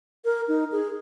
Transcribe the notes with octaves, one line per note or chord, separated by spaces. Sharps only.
A#4
D#4
G#4